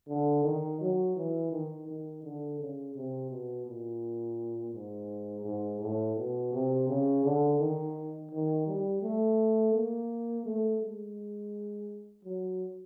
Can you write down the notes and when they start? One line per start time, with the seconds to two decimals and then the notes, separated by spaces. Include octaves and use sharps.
0.09 D3
0.44 D#3
0.81 F#3
1.16 E3
1.52 D#3
1.88 D#3
2.24 D3
2.59 C#3
2.95 C3
3.30 B2
3.67 A#2
4.74 G#2
5.45 G#2
5.81 A2
6.17 B2
6.53 C3
6.88 C#3
7.24 D3
7.60 D#3
8.31 D#3
8.67 G3
9.02 A3
9.74 A#3
10.46 A3
10.82 G#3
12.25 F#3